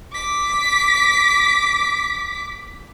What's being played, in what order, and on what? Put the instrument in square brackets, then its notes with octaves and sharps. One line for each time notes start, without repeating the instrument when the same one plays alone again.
[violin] D6 B6